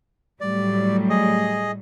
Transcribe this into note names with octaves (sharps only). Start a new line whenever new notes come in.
A2 F#3 G3 D5
G#4 D#5